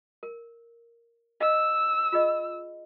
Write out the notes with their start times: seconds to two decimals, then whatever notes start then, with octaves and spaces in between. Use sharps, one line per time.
0.23 A#4
1.41 D#5 F5 E6
2.12 F4 G#4 D#5